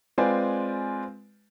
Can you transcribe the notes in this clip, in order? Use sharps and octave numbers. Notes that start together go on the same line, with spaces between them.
G#3 C4 F4 B4 D5 G#5